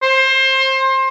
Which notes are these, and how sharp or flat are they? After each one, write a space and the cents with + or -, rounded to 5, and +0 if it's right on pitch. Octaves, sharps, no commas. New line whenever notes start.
C5 +25